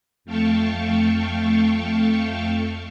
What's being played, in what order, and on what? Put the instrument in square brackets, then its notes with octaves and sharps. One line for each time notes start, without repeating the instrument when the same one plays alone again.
[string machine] F2 A3 F5 G5 A5 C#6